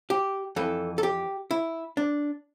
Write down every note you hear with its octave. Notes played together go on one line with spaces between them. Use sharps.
G4
F2 E3 A4
A4
G4
E4
D4